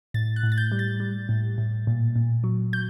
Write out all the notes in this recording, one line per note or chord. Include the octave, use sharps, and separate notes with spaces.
A2 A6
F#6
A2
A6
G6
G3
A6
G3
A2
A2
A#2
A#2
F#3
F#3 G6